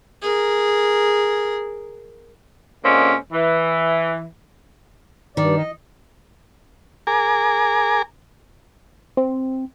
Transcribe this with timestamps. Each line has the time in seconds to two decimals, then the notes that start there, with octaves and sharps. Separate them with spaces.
0.22 G#4 A#4
2.85 A#2 D3 G#3 A#3 C4 C#4
3.32 E3
5.37 G2 D#3 D5
5.57 D#5
7.07 G#4 A#4 G#5 A#5 D6
9.17 C4